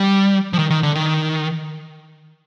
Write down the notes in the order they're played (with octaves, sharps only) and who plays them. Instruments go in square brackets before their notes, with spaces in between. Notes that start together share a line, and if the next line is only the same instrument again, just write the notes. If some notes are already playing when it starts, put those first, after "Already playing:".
Already playing: [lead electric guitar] G3
F3
D#3
D#3
D3
D#3